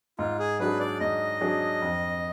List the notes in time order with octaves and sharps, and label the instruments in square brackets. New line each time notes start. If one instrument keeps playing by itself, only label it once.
[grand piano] G#2 [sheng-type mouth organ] F4
[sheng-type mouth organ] G#4
[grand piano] F#3 D4 G#4 [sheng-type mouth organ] B4
[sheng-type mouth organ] D5
[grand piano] G#2 [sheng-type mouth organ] D#5
[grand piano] F#3 D4 G#4
F2